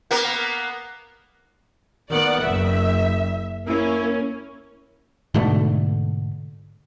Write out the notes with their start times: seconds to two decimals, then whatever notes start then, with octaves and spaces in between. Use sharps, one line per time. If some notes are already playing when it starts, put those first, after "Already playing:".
0.11 A#3 B3 A#4
2.10 D#3 B3 D5 F#5
2.42 F#1 E5
3.67 A#3 C#4 E4
5.34 G#2 B2 D3 A3